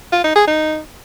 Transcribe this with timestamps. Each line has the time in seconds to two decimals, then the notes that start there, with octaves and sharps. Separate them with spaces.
0.12 F4
0.24 D#4
0.36 G#4
0.47 D#4